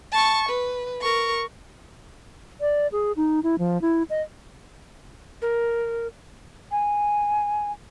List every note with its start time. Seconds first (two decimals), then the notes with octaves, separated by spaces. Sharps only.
0.12 A5 C#6
0.49 B4
1.02 A#4 C#6
2.61 D5
2.92 G#4
3.17 D#4
3.43 E4
3.59 F3
3.82 E4
4.10 D#5
5.42 A#4
6.71 G#5